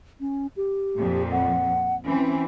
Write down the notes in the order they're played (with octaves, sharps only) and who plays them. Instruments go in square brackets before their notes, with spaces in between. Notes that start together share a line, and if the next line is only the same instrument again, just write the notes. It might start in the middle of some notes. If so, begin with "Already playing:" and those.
[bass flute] C#4
G4
[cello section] F2 A#2
[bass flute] F#5
[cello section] E3 C4 [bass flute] C#4